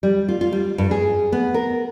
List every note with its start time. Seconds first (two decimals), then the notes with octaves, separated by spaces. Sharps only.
0.03 G3
0.28 F4
0.41 F4
0.52 G3
0.78 G2
0.91 G#4
1.32 B3
1.54 A#4